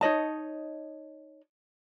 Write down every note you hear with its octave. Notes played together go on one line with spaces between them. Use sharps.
D#4 C#5 D#5 A5